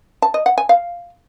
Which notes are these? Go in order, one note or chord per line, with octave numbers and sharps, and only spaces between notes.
A5
D#5
F#5
G#5
F5